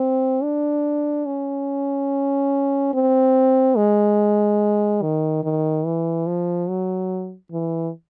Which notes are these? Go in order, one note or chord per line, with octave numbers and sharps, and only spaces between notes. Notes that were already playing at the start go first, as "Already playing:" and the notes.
Already playing: C4
D4
C#4
C4
G#3
D#3
D#3
E3
F3
F#3
E3